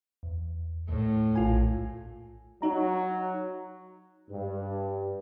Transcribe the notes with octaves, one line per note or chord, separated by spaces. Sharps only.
E2
D#2 A2
A#1 F4 G#5
F#3 D#4 A#5
G2